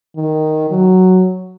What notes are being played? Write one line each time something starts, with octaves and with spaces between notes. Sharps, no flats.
D#3
F#3